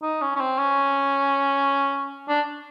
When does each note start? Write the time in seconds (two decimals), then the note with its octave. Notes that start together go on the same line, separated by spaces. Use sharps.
0.03 D#4
0.22 C#4
0.36 C#4
0.41 C4
0.59 C#4
2.29 D4